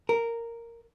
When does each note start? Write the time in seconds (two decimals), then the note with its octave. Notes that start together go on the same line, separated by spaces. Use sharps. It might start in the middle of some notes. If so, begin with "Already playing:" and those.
0.09 A#4